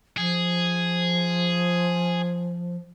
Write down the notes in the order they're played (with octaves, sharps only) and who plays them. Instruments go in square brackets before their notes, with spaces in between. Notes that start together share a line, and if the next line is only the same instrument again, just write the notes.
[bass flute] F3 [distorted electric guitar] G#4